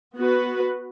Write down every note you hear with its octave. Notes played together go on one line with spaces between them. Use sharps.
B3 F#4 B4